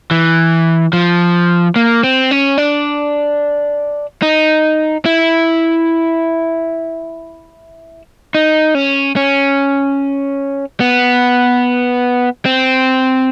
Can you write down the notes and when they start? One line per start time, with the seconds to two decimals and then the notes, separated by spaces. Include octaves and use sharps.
0.11 E3
0.93 F3
1.76 A#3
2.04 C4
2.31 C#4
2.58 D4
4.22 D#4
5.06 E4
8.35 D#4
8.75 C#4
9.16 C#4
10.80 B3
12.45 C4